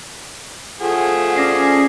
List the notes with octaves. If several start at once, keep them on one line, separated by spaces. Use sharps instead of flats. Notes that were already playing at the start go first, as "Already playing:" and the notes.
F3 A3 G#4 F#5
C#4 D5 D6 A#6 C7